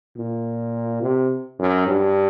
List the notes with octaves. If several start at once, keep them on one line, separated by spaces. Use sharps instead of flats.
A#2
C3
F#2
G2